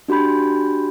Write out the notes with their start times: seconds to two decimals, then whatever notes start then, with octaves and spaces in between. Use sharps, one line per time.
0.08 D4 F#4 G4 B5 G6